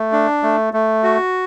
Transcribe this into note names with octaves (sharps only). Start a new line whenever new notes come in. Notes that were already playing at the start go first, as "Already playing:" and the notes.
Already playing: A3
D4
A3
A3
F#4